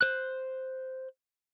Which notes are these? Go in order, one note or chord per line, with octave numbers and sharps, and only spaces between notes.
C5 F#6